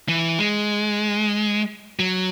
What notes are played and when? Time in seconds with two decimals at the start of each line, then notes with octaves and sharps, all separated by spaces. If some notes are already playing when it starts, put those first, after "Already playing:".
0.09 E3
0.39 G#3
1.99 F#3